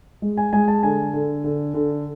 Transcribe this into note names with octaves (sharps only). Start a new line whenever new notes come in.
G#3
G#5
G#3 G#5
A5
D3 G#5
D3
D3
D3